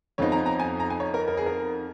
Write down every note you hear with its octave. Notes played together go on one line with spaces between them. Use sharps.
F2 F3 B3 D#4 C#5
A#5
A#5
G#5
A#5
G#5
C#5
A#4
A#4
G#4
A#4